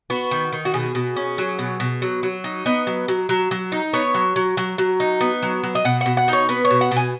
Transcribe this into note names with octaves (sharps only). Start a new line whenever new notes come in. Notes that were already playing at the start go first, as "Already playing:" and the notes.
B3 F#4
D#3
D#3
F#4
B2 G#4
B2
C#4
F#3
B2
B2
F#3
F#3
D#4
B3 D#5
F#3
F#3
F#3
F#3
D#4
B3 C#5
F#3
F#3
F#3
F#3
D#4
B3
F#3
F#3
D#5
B2 F#5
B2 F#5
F#5
D#4 C#5
B3 B4
C#5
B2
F#5
B2
G#5